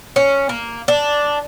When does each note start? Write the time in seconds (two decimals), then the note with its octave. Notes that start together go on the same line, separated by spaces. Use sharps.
0.16 C#4
0.49 A#3
0.88 D4